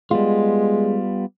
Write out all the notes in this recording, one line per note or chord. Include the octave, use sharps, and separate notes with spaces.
G3 G#3 B3 F4